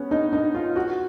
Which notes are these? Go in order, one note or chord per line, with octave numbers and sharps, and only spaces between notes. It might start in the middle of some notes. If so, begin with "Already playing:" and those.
Already playing: B3 C#4
D#4
D#4
F4
F#4